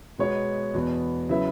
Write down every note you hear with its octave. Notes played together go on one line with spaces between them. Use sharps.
B2 G#3 B3 F#4 C#5
E2 B2 B3
C#3 F#3 E4 B4 E5